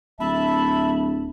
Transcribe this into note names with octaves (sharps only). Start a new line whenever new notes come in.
D1 E5 A5 B5